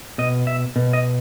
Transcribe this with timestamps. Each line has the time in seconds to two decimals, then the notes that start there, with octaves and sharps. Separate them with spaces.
0.18 B2 D#5
0.47 E5
0.76 B2
0.93 D#5